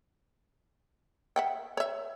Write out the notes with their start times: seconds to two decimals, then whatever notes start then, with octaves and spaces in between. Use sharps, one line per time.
1.36 E5 F#5 G5
1.77 C#5 E5